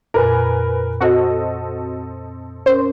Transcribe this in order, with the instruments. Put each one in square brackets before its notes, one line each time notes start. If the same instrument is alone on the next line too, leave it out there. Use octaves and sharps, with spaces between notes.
[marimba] F2 A#2 [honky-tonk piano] A#4 B4 G#5
[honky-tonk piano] C4 A4 D#5 [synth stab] F#4
[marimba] C#4 A#4 [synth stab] C5